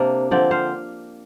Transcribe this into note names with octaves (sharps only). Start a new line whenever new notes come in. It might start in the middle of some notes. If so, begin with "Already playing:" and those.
Already playing: C3 A#3 D4
D3 F3 C4 D5 G5
C5 F5